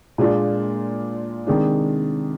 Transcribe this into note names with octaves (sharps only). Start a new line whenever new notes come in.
A#2 G#3 D4 F4
C3 D#3 G#3 D4